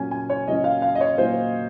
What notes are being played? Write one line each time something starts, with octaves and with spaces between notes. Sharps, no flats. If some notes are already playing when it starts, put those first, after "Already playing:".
Already playing: A#2 F#3 A#3 C#4 G#5
G#5
C#5
A#2 F#3 A#3 C#4 D#5
F5
F5
D#5
C#5
A#2 F#3 A#3 C#4 C5